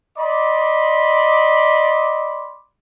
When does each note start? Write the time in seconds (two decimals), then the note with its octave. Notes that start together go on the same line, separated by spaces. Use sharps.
0.16 D5 D#5 B5 C6 D6